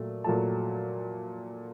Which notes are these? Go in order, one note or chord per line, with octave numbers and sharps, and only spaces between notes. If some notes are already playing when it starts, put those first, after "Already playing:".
Already playing: A#2 F#3 A3
A#2 F#3 A3 A5